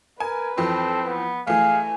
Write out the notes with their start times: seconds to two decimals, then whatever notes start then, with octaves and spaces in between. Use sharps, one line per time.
0.20 A#4 B4 G#5
0.58 F2 E3 F3 C4 A4
1.06 B3
1.47 E3 A3 G#4 F5 G#5